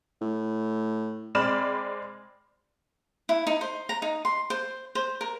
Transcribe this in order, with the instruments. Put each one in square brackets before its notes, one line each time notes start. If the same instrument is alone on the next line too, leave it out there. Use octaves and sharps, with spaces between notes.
[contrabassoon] A2
[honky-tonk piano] G#3 C4 D5 B5 F6 E7
[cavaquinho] E4
D#4
C5
A#5
D#4
C6
C5
C5
A#4